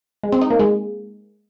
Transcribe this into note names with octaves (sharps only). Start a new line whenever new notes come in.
G#3
C4
D#4
A#3
G#3